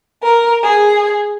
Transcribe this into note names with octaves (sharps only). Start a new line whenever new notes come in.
A#4
G#4